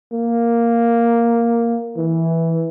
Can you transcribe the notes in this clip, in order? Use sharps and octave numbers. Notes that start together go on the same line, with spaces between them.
A#3
E3